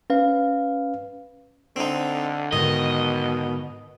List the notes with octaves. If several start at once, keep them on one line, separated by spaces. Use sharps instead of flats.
C#4 B4 F5
D3 C4 D#4
G#2 B2 D3 D#3 D#5